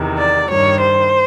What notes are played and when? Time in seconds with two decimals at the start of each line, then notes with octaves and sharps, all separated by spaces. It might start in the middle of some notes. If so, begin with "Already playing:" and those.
Already playing: E2 C3 D#3
0.19 D5
0.49 G2 D#3 G3 C#5
0.80 C5